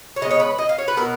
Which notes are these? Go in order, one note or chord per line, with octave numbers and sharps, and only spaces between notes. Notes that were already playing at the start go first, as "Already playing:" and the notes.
C#5
C#3 G#3 B3 D#5
C#5
B4
D#5
F5
C#5
B4
B2 F#3 B3 A#4